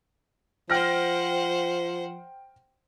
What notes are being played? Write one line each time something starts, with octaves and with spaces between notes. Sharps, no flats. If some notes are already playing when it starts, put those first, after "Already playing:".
F3 C5 F#5 G5 F6 A#6